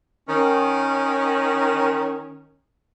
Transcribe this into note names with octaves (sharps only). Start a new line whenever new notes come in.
D#3 C#4